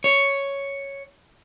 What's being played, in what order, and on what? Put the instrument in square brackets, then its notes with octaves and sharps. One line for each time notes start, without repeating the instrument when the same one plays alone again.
[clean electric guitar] C#5